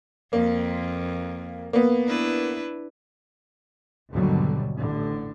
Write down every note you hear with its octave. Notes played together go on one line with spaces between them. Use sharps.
F2 A#3
A#3 B3
D4 E4 B4
D#2 G#2 B2 D3 F#3 G3
A1 A2 D3